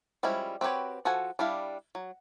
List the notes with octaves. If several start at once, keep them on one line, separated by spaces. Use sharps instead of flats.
F3 G3 G#3 C#4 E4
C4 F#4 G4 B4 C#5
F3 F#4 A4 F#5 G#5
G3 D4 E4 F5
F#3